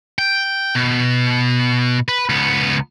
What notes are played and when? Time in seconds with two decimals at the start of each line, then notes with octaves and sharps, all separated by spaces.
0.19 G5
0.75 B2
2.09 B4
2.29 C#2 B3